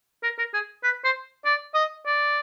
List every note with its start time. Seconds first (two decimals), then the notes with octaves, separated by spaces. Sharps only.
0.23 A#4
0.38 A#4
0.54 G#4
0.84 B4
1.04 C5
1.45 D5
1.75 D#5
2.06 D5